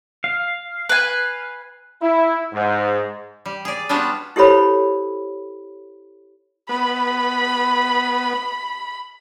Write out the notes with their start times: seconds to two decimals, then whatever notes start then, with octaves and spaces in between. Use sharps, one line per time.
0.24 F5
0.89 B4 G#5
2.02 E4
2.53 G#2
3.46 G3
3.65 G#4 D5
3.89 G3 B3 D4 F4 F#4
4.36 E4 G4 A4 C5 C#5 B5
6.69 B3 B5